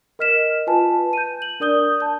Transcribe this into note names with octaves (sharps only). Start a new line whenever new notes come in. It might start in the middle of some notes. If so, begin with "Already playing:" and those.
A#4 D#5 F6 B6 E7
F4 B4 G#5 A5
G6 D#7
F#7
D4 A#4 D5 D#6 G6 G7
A5 G6